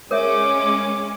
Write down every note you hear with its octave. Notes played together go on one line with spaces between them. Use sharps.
G#3 C#4 A#4 C#5 E5 D6